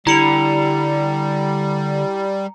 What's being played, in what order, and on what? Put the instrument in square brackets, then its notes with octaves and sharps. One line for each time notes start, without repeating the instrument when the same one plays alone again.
[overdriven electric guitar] D3 [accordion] G3 [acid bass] E4 [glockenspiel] A#5 C#7 F7